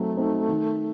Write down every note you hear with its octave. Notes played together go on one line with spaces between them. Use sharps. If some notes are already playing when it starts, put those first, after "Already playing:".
Already playing: F#3 A3 C4 D#4
C4 D#4
D#3